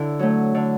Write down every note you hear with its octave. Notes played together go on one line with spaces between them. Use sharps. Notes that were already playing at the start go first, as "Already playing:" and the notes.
Already playing: D3 E4
F#3 A3
D3